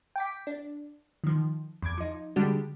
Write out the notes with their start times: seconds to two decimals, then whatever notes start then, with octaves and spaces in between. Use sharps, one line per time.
0.16 G5 D6 B6
0.47 D4
1.24 D#3 F3
1.82 E2 D6 G#6
1.98 F3 D#4
2.36 D3 G3 G#3 D4 F#4 G4